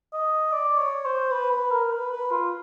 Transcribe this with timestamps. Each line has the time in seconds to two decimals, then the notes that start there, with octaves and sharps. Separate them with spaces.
0.13 D#5
0.52 D5
0.78 C#5
1.05 C5
1.31 B4
1.51 B4
1.71 A#4
1.92 B4
2.12 B4
2.31 F4